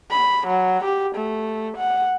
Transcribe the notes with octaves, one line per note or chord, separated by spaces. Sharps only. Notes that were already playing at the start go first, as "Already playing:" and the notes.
B5
F#3
G4
A3
F#5